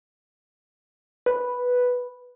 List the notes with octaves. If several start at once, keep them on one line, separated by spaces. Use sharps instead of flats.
B4